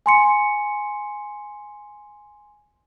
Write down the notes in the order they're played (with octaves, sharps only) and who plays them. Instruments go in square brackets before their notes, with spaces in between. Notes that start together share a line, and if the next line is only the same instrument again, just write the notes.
[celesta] G#5 C6 C#7